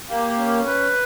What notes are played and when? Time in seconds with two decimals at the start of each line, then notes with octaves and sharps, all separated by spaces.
0.09 A#3 G4
0.38 C#4
0.66 B4